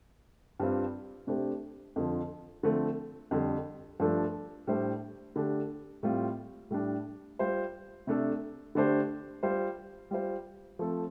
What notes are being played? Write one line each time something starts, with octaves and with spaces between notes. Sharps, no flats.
G2 G3 C4 F4 C5
C3 A3 D4 G4 C5
F2 D3 F3
D3 F3 A3 C4
F2 D3 G3
G2 F3 A3 D4 A4
A2 G3 D4 A4 C5
D3 A3 D4 G4
A2 G3 C4 F4
A2 G3 D4
G3 F4 C5
C3 A3 D4 A4
D3 A3 D4 G4 C5
G3 F4 C5
G3 F4 C5
F3 A3 C4 A4